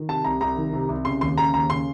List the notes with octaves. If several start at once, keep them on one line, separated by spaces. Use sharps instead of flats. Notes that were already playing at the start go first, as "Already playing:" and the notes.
Already playing: D#3
C3 A5
C2 A#5
C2 A#5
D#3
C3
C2
C#3 C6
D#2 C6
C#3 A#5
D#2 A#5
C#3 C6